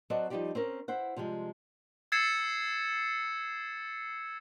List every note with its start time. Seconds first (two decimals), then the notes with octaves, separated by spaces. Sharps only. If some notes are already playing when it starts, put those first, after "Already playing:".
0.10 F#3 C4 F#4 A4 D5 D#5
0.30 F3 G3 D#4 F4 G4 D5
0.55 C4 C#4 A#4
0.88 E4 C5 F#5
1.17 C3 F3 G3 G#3
2.12 E6 G#6 A6 C7 C#7 E7